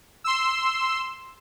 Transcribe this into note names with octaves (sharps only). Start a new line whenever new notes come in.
C6 E6